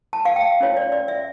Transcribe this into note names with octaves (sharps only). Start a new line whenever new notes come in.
A5
F5
G5
C#4 F4 C#5
D5
D5
E5